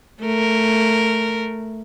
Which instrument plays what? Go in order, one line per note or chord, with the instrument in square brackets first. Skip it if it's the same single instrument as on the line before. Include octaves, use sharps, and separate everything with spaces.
[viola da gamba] A3 A#4